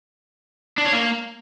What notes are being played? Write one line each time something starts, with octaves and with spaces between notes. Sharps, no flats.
D4
C#5
A#3